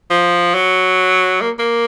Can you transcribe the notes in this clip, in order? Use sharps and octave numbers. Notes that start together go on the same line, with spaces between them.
F3
F#3
A#3
A#3